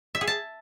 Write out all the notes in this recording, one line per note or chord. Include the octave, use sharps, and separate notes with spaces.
E5
G#4
A5